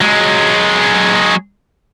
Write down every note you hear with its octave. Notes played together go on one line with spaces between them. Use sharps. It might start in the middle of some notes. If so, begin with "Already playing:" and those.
F#3 G#3